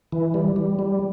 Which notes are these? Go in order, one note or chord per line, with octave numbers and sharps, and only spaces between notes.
E3
G3
G3
G3